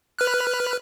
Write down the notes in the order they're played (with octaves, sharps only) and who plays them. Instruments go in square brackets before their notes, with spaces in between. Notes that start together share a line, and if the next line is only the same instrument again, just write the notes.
[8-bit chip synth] B4 F6 F#6